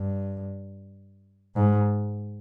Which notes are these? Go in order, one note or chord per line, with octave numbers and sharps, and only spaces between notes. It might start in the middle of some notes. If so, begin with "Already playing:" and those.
Already playing: G2
G#2